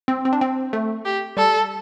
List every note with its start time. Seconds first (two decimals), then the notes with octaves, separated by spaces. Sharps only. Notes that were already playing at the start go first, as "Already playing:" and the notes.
0.08 C4
0.25 C4
0.33 D4
0.41 C4
0.73 A3
1.05 G4
1.37 G3 A4